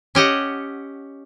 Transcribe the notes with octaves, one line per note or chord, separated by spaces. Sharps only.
C#4 G4 D#5 F#5